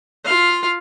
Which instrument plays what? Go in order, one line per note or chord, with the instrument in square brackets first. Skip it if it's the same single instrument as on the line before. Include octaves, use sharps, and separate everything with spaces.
[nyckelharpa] F4 F5